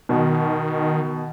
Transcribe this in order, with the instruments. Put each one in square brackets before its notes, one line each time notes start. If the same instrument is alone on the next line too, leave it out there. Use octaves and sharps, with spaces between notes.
[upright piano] B2 [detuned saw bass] D#3